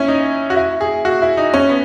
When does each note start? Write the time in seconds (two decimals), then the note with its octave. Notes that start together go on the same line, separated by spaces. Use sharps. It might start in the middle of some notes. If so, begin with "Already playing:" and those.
Already playing: C#4 E4
0.08 D#4
0.50 F#4
0.56 E4
0.81 G#4
1.05 F#4
1.22 E4
1.37 D#4
1.54 C#4
1.69 B3